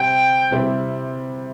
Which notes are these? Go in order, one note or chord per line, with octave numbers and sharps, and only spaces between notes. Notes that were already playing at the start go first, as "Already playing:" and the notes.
Already playing: C3 G3 C4 G5
C3 G3 C4 E4 G4